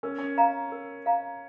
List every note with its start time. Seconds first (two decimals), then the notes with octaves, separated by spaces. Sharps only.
0.03 C#4 A#4
0.18 C#4
0.38 F5 A#5
0.72 A#4
1.06 F5 A#5